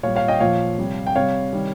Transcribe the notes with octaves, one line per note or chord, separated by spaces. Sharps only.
A#2 G3 C#5 F5
C#5 F5
D#5 G5
A#2 F3 C#5 F5
C3 G3
G5
C3 G3 C#5 F5
C3 D#3 G3